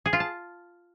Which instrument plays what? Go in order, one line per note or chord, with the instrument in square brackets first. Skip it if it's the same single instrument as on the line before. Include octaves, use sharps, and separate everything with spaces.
[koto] G#4
F4
A5